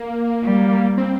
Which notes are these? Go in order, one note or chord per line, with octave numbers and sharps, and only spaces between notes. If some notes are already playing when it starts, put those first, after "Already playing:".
Already playing: A#3
G3
C4